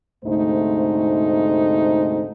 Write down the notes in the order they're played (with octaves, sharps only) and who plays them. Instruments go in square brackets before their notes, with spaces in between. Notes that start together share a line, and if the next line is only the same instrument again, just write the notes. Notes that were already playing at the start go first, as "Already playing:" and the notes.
[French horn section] D2 G#2 C3 A3 D#4 C5